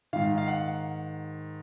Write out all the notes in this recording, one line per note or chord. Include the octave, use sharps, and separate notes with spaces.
G#2 D#3 F5
F5
F#5